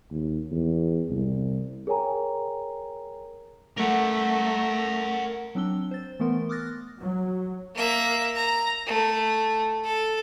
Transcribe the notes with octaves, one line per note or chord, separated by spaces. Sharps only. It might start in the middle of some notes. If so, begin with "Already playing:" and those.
D#2
E2
C2
G#4 A#4 C#5 G5 G#5 A#5
A3 A#4 F#5
F#3 C4 D4 E6 G7
C5 A6
E3 A3 B3 A#4 C6
D6 D#6 F6 F#6 A6 A#6
F#3
A#3 E5
A#5
A3
A4